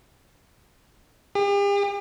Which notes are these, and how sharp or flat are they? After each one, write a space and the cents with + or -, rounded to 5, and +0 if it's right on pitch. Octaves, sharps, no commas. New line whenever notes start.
G4 +45